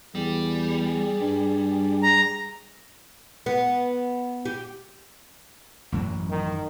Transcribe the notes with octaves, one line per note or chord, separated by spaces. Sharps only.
E2 G3 G#4
G2
A#5
B3
G4
A1 F#2 F#3
D#3